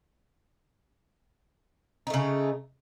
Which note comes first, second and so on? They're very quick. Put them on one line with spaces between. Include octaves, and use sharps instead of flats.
D#4 A3 C#3